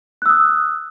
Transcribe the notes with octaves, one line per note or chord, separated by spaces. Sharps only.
D#6 E6 F#6